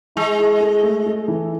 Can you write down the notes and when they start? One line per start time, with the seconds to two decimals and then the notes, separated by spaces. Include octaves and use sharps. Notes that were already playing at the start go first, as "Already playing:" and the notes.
0.16 G#3 E4
0.38 E4
0.61 A4
0.83 A3
1.06 A4
1.28 E3